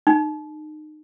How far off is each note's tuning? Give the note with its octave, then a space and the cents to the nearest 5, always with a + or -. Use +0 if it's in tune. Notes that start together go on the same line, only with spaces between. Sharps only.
D#4 -25